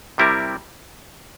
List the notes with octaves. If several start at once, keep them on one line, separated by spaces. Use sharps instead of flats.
C3 G3 C4 E4 A#4